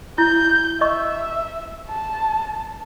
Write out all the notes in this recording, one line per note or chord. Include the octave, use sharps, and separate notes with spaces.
E4 G6
D#5 E5 C#6
A5